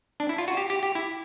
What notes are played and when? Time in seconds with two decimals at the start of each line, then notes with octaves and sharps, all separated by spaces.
0.20 D4
0.29 E4
0.38 F4
0.48 F#4
0.57 G4
0.70 G4
0.83 G4
0.95 E4